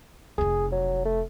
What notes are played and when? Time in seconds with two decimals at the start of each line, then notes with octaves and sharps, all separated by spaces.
0.38 F1 D#4 G#4
0.72 F#3
1.05 A3